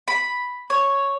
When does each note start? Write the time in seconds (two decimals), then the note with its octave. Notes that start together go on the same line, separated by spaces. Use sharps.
0.08 B5
0.70 C#5